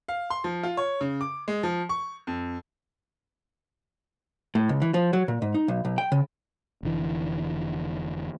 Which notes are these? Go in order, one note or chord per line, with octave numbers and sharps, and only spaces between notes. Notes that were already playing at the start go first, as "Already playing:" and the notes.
F5
C6
F3
F4
C#5
C#3
D6
G#3
F3
C#6
F2
A2
C#2
E3
F3
F#3
A#2
G#2
D#4
B1
B1
G5
C#3
F1 D3 E3